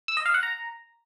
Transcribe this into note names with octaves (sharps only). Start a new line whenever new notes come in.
E6
D#5
F5
F#5
A#5